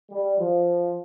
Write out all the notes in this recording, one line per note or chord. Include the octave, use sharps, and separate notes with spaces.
G3
F3